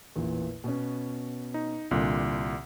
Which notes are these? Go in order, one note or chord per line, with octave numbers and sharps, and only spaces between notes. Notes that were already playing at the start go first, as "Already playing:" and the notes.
A1 E2 A#2
B2 B3 C#4
D#4
C2 A#2 D3 C6 F#6